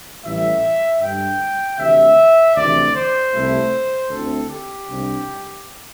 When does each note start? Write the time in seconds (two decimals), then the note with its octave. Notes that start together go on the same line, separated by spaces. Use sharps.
0.23 A1 A2 E3 G3 E5
1.01 G2 D3 G3 G5
1.78 D2 C3 E3 E5
2.55 D2 C3 E3 D5
2.94 C5
3.33 C2 C3 A3 C4 E4
4.10 D2 D3 C4 E4 A4
4.49 G4
4.87 C2 C3 G3 D4